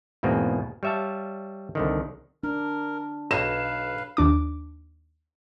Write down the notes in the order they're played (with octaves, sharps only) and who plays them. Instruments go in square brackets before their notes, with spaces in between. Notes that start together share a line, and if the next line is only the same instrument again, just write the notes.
[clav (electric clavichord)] E2 G#2 B2 A#3 C4
G3 C#5 E5 F5 A5
C2 D3 D#3
[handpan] D4 [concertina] A#4
[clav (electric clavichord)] B1 [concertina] B4 F5 [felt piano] E7
[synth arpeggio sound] D#2 D4 D6